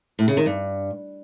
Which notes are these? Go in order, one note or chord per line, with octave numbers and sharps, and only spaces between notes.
A2
C#3
D#3
G2